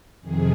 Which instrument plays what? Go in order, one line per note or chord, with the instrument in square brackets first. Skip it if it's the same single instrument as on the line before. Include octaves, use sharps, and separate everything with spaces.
[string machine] F2 C3 D#3 G#4